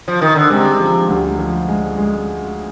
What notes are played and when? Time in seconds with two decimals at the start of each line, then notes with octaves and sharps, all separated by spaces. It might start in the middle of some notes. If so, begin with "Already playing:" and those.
0.08 F3
0.21 D#3
0.36 D3
0.50 C3 G#3
0.80 F3
1.09 D2
1.39 F3
1.68 G#3
1.98 G#3